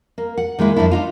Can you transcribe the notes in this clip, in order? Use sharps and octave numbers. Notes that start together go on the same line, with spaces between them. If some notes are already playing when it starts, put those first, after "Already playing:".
A#3
F#5
D#3 G#3 A#3 E4
F#2 F3 C#4 D4 E4
D4 D#4 F4